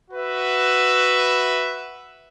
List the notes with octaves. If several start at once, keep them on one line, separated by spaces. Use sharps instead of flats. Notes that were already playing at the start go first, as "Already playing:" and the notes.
F#4 B4 E5